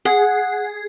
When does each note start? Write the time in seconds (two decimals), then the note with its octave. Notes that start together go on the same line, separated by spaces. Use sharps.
0.05 G#4 F#5